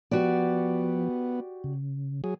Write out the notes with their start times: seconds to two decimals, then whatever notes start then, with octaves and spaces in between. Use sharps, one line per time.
0.11 F3 B3 F#4 G4 D5
1.64 C#3
2.24 F#3 G#4